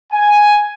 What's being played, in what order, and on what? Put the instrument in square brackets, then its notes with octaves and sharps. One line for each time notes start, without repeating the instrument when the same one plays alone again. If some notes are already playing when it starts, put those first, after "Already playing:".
[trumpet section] G#5